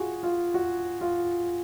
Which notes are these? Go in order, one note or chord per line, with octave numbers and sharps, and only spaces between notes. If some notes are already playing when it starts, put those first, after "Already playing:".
Already playing: F4 F#4 G#4
F4
F#4
F4